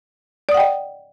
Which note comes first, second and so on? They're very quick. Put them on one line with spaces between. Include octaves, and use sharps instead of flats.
D5 D#6 F#5 G5 D#5